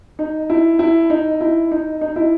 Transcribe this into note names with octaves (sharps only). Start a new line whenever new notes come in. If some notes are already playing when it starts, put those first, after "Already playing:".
D#4
E4
E4
D#4
E4
D#4
D#4
E4